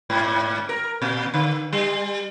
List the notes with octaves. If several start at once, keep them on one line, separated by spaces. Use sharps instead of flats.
G#2
A#4
A#2
D3
G3